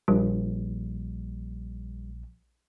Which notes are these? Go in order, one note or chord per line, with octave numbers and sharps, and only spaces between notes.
A#1 G3